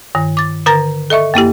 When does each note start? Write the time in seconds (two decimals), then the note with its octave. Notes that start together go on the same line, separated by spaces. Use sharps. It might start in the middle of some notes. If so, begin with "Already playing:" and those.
0.15 G2 D#3
0.37 D6 A6
0.66 D3 A#4 A#5 A6 A#6
1.10 A4 D#5 E5 C#6
1.34 F#2 A#3 E4 G4